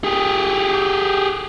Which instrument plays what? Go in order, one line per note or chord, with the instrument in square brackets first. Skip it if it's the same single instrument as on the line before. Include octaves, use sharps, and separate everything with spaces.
[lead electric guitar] G4 G#4